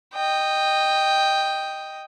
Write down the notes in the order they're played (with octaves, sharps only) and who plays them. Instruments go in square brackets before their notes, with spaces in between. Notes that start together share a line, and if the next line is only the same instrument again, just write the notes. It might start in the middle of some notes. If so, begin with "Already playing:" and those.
[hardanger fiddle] D#5 G5